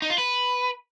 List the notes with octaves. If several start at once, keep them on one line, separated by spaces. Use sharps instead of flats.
D#4
F4
B4